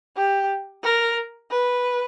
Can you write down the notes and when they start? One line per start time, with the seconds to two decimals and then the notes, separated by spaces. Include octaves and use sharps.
0.16 G4
0.83 A#4
1.51 B4